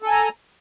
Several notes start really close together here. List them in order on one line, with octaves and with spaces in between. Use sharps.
A4 G#5 A#5